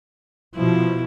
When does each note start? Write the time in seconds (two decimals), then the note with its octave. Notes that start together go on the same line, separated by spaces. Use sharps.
0.56 B2 F3 E4